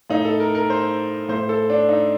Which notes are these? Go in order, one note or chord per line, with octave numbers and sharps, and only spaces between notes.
A2 D#4
A4
A#4
A#4
C5
A2 C5
A4
D4
D#4